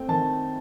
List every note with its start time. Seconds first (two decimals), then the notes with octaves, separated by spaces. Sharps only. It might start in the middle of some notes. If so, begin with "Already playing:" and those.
Already playing: A3 C4 G5
0.09 D#3 A5